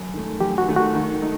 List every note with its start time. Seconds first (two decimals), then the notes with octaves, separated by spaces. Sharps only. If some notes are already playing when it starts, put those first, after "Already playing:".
Already playing: F#2
0.14 D#3 A3
0.41 F#2 G4
0.58 F#4
0.68 D#3 A3
0.77 F#4
0.95 D#3
1.22 A3 D#4